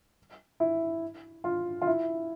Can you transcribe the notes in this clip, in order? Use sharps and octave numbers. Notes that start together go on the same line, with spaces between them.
E4
F4
F4
E4